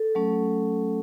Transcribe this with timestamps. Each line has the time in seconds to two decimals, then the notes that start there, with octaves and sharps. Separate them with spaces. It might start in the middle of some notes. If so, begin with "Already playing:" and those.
Already playing: A4
0.15 F#3 A3 C#4